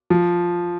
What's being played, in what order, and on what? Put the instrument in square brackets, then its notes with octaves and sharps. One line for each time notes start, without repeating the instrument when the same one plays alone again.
[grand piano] F3